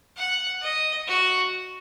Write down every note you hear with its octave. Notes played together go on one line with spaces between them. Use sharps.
F#5
D#5
F#4